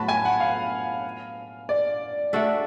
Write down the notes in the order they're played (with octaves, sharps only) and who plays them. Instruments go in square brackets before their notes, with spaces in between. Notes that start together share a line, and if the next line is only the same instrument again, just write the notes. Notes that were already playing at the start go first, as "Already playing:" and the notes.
Already playing: [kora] A2 F#3 B3 F#4 [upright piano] A5 B5
[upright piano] G#5
F#5
F5
D5
[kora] A3 D4 F#4 A4